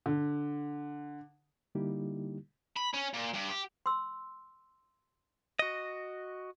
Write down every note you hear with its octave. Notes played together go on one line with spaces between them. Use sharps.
D3
D3 G3 A#3 D#4 E4 G4
B5
C#4
A#2
G2
G4
C6 E6
F#4 D#5